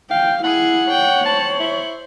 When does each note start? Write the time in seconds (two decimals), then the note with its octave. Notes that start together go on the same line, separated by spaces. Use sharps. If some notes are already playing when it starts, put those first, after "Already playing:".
0.11 F5 G5
0.44 E4 G#4 F#5 F#7
0.89 C#5 G5
1.25 C5 A5
1.59 E4